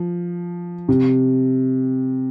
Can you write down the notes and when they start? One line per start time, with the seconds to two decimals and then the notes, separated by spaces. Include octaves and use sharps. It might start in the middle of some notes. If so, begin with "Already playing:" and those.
Already playing: F3
0.89 C3